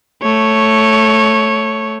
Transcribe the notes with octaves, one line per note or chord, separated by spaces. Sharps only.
A3 C#5